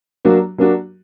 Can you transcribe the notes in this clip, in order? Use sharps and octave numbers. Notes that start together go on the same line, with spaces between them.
F#3 A#3 D4 F#4
F#3 A#3 D4 F#4